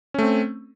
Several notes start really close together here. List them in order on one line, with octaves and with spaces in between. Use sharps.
C#4 A3 C4